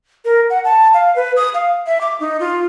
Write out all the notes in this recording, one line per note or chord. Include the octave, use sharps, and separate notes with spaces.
A#4
F#5
A5
F5
B4
D#6
F5
E5
D6
D#4
F4